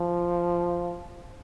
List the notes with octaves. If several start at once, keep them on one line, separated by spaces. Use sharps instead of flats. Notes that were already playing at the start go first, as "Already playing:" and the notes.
Already playing: F3